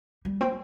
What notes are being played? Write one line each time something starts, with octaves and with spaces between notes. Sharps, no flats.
G3
C4